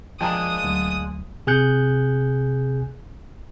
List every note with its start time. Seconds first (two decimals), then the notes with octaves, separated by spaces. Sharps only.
0.21 F3 G#3 A#3 D4 G5 A5 A#5 D#6
0.64 D2 F#3
1.47 C3 G#4 G#5 F#6 G6 C#7